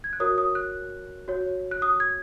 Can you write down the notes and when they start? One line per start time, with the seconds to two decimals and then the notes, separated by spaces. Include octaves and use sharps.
0.04 G#6
0.13 F#6
0.20 F#4 A#4 C#5 D#6
0.38 D#6
0.55 F#6
1.28 F#4 C#5
1.71 F#6
1.82 D#6
2.00 G#6